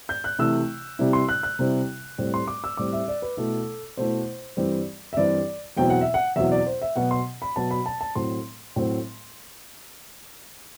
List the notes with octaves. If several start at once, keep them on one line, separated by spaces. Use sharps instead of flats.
G6
F#6
C3 E3 A3 E4 E6
C3 G3 C4 E4
C6
F#6
F#6
C3 G3 C4 E4
A2 G3 C4
C6
D6
E6
A2 G3 C4 D6
E5
D5
B4
B2 A3 E4 A4
B2 A3 E4 C5
G2 E3 G3 C4
E5
G2 E3 G3 C4 D5
E2 B2 F#3 C4 E4 G5
F#5
E5
F#5
E2 B2 F#3 C4 E4 E5
D5
C5
E5
B2 F#3 B3 F#5
C6
B5
B2 F#3 B3 A5
B5
A5
A5
A2 F#3 C4 C6
A2 F#3 C4